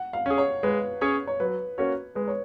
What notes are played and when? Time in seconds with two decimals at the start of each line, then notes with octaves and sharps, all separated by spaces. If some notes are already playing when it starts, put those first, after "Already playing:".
Already playing: F#5
0.13 F5
0.26 C#4 G#4
0.38 C#5
0.63 G#3 B4
1.01 C#4 G#4 C#5
1.27 C#5
1.40 F#3 B4
1.78 A#3 C#4 F#4 C#5
2.15 G#3 B4
2.28 C#5